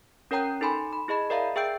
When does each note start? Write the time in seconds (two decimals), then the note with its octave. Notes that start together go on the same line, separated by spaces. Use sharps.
0.31 C#4 A#4 C#5 G5 A#5 G6
0.61 D#4 A4 G#5 B5 C6
0.93 B5
1.08 E4 G#4 D#5 B5
1.30 A#4 D5 E5 F5 A#5
1.56 G#4 E5 G5 E6 G6 D7